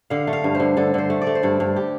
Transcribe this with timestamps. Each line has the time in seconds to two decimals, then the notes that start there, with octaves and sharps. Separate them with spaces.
0.10 D3 F5
0.27 A3
0.33 F5
0.44 G2
0.55 C5
0.60 D3
0.77 D3 A4
0.94 D3 C5
1.10 A3
1.22 D5
1.27 A3
1.35 C5
1.43 G2 A4
1.60 G2
1.76 G4